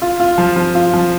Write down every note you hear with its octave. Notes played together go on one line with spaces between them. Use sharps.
F4
F4
F3
F3
F4
F3